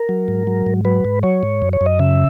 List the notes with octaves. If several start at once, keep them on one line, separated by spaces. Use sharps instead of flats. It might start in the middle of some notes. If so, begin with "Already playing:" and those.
Already playing: A#4
F#3
G#2
F#3
G#2
F#3 B4
G#2
F#3 C#5
G#2
F#2
C#5
F#2
D#5
C#3 E5